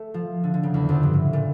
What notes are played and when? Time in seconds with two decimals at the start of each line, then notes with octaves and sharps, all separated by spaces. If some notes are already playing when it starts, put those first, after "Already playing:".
Already playing: A3
0.14 F3
0.44 D3
0.54 D3
0.63 C#3
0.74 E2
0.89 F2
1.03 G2
1.14 A2
1.33 A#2